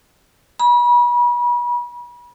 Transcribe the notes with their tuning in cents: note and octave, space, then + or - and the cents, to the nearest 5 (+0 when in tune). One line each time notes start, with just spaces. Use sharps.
B5 -35